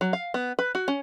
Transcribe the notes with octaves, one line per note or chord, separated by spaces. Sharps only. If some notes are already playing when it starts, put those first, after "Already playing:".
F#3
F5
B3
B4
F#4
C#4